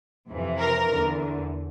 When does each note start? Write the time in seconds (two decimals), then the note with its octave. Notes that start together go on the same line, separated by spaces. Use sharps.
0.27 F2 C3 E3
0.59 A#4
0.89 E2 D3